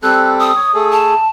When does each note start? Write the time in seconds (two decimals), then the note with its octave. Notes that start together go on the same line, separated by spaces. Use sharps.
0.03 G3 C4 A4 F#6
0.40 D#6
0.56 C#5
0.74 A3 G#4 A4
0.92 A5